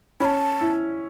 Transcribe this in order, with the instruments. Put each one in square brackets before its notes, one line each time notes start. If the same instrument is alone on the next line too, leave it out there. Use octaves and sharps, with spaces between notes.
[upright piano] C#4 [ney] B5
[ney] A5
[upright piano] E4